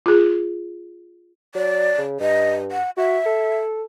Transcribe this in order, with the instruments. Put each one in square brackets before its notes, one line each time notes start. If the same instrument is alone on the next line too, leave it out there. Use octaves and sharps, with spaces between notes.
[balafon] F4 G#4
[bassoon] F#3 [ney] D5
[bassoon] C#3
[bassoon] G2 [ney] D#5
[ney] F#5
[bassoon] F#4 [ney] E5
[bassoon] A4